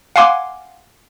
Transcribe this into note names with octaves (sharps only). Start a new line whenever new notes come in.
F5 F#5 G#5 C6 D6